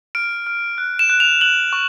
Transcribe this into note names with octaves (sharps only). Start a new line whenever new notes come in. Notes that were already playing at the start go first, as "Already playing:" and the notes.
F6 D7
F6
F#6
E7
F#6
F7
F#6 F#7
C#6